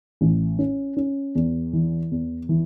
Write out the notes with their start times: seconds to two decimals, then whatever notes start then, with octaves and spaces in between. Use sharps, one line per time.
0.21 A1
0.59 C#4
0.97 C#4
1.35 E2
1.73 E3
2.11 E2
2.49 E3